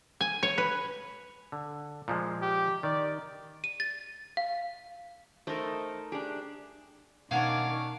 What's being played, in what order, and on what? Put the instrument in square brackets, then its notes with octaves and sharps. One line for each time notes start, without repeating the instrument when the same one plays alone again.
[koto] G#5
C#5
B4
[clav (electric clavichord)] D3
A#2 F3 G#3
[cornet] G4
[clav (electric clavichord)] D#3 [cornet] D5
[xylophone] D#7
A6
F5
[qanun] A3 D#4 A#4 [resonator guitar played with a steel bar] C5
[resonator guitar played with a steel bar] D4 G#4 [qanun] G4
[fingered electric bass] B2 [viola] D#3 D6 [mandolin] C#4 D4 C#5 [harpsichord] F5 F#5